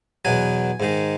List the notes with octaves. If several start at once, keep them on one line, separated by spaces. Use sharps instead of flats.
E2 B2 F#3 G#5
G#2 D#3 G#3